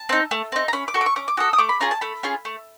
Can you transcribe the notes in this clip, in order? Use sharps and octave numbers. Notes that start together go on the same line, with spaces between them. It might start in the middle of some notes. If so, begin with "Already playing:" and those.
Already playing: A5
C4 D#4
A3
C4 D#4
A#5
C#4 B5
D6
F#4 A4 C#6
D6
C#6
C#4 D6
D6
F#4 A4 D#6
D#6
A3 D6
B5
C#4 F4 G#4 A#5
A5
A3 B5
C#4 F4 G#4
A3